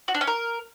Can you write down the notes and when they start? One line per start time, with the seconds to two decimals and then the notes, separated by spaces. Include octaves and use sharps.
0.08 F#4
0.14 D4
0.21 C#4
0.27 A#4